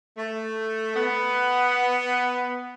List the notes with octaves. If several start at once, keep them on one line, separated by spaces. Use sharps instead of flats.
A3
B3